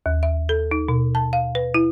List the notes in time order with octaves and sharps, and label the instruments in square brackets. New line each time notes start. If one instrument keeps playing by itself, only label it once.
[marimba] D#2
E5
A4
D#4
B2
A5
F5
B4
E4